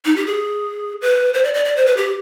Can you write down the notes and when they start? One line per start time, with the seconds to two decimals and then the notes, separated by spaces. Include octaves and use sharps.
0.05 D#4
0.16 G4
0.26 G#4
1.02 B4
1.34 C5
1.44 D5
1.54 D5
1.65 D5
1.76 C5
1.86 B4
1.97 G4